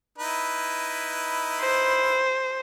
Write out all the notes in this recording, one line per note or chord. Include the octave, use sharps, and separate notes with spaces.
D#4 E4 B4
C5